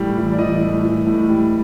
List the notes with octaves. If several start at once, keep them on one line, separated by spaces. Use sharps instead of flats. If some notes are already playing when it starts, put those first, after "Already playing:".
Already playing: A2 E3 G3
E3
D5
E3 D#5
A2
E3
A2
G3